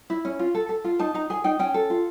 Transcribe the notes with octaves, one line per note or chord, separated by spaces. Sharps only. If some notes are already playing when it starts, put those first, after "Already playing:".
E4
C#4
F4
A4
A4
F4
D#4 A5
D#4 A#5
G#4 G#5
D#4 G5
C#4 G5
A4
F4